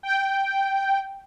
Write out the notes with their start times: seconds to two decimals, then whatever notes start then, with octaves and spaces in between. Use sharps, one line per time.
0.03 G5